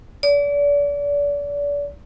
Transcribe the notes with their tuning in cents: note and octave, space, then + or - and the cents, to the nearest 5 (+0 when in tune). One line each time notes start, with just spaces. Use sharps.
D5 -35